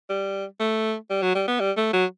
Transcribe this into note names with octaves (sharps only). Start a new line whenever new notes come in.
G3
A3
G3
F#3
G3
B3
G3
A3
F#3